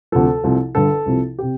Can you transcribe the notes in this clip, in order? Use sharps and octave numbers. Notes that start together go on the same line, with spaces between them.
D2 C3 F3 A4
C2 C3 F3
G1 G2 D3 A4
C2 C3 F3
C3 G4